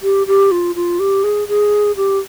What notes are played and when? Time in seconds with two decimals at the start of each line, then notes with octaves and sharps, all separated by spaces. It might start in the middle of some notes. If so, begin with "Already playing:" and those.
0.03 G4
0.27 G4
0.51 F4
0.75 F4
0.99 G4
1.24 G#4
1.48 G#4
1.97 G4